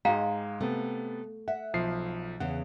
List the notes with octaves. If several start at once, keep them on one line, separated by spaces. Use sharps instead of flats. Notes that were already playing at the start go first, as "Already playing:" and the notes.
G#2 G#3 D#5 F5 G5 A#5
C3 A3 B3
E5 F#5
B1 F3 C7
E2 C#3 F#5